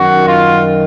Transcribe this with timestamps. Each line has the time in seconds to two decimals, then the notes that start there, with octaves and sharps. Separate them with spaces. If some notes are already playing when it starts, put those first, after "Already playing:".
Already playing: F#2 D#3 F#4
0.27 F4